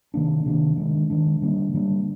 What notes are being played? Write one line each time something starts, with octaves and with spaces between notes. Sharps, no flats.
C3 D#3 A#3 D4
C3 D#3 A#3 D4
D#3 G#3 D4
D#3 G#3 D4
D3 G3 A#3 D4
D3 G3 A#3 D4